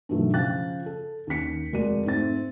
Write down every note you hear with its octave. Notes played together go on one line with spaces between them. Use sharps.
G2 B2 D#3 E3 F#3 A3
C#3 F3 F5 G5 F#6 A6
A4
D#2 D#3 C#4 B6 C#7
F1 G#3 F#4 A#4 D5 D#7
G#2 A3 C4 A6